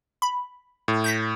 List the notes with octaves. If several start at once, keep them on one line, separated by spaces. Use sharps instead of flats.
B5
A2
G6 A#6 B6